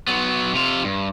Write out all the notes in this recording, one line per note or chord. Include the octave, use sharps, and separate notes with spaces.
F#3 B3
C3 F4
G2